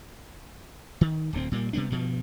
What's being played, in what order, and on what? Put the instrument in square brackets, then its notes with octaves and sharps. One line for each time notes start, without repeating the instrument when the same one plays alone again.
[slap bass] D#3
D1 D2 A3 C4
A#2 G3 A#3
C3 G3 B3 D4
G2 B2 F3